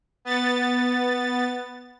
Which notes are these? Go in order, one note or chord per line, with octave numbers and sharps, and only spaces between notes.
B3 A6